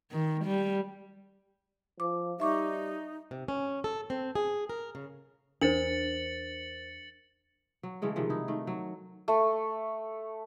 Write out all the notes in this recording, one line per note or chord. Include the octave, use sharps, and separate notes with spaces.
D#3
G3
F3 D6
G3 D#4 E5 C#6 D6
C3
C#4
A4
C4
G#4
A#4
C#3
E2 D4 A#4 C5 A6 C#7 F#7
F#3
C#3 E3 G#3 A3
C3 D#3 F3
D#4 E4
D#3 A3
F#3
A3